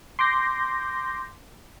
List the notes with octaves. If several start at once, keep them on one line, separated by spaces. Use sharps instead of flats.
C6 D6 G6 A#6